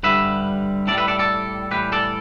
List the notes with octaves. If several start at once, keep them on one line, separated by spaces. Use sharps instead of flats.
G2 D3 G3 B4 E5
A2 G3 A4 D5
B4 E5
A4 D5
A4 D5
A2 E3 G3 G4 B4
A4 D5